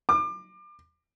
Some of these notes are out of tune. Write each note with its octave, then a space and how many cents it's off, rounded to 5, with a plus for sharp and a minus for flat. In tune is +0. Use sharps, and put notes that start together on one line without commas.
D6 +30